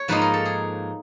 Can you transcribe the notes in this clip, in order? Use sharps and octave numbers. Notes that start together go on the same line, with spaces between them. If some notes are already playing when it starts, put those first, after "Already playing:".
Already playing: C#5
G#2 F3 A#3 D#4 B4
A#4
A4
G#4